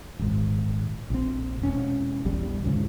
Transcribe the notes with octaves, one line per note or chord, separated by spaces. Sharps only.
D#1 G#1 G#2
A#1 C4
E1 C#4
A#1 E2 G3
D2 G#2 C#3 E3